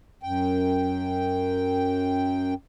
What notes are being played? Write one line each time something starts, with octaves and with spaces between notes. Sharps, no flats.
F#2 G5